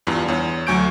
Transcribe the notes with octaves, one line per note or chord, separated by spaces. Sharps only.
E2 G2 F4
E2 C#5
D2 F#3 G#5 C#6 G6 D7